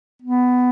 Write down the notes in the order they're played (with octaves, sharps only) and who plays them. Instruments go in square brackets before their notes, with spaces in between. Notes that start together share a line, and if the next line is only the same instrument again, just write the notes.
[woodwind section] B3